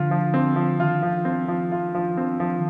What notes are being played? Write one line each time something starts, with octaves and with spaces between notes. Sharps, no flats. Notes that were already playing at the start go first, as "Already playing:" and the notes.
Already playing: D3 F3 F4
F3
C4
F3
D#3 F4
F3
C4
F3
F4
F3
C4
F3